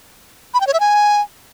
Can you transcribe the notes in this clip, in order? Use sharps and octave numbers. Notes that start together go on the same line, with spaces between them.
B5
G5
C#5
E5
G#5